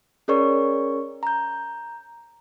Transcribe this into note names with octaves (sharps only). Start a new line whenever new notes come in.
C#4 G#4 A#4 C#5 D5 C#6
A#5 G6